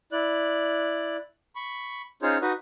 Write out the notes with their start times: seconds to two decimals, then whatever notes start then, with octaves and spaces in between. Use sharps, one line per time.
0.12 E4 D5 F#6
1.56 B5 C#6
2.22 C#4 D#4 F4 G#4 C5 C#5
2.42 D#4 F#4 B4 D#5